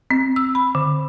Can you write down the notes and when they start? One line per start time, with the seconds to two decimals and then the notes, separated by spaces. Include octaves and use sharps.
0.11 C4
0.36 E6
0.55 B5
0.75 D3